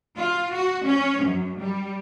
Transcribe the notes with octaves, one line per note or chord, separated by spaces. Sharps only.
F4
F#4
C#4
F#2
G3